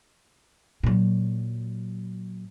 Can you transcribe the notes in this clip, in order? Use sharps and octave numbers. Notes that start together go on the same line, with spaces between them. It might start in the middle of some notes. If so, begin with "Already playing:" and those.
A#2 F#3